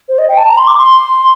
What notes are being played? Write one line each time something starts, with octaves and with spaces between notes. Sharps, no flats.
C5
D#5
G5
A5
A#5
C6
D6
C6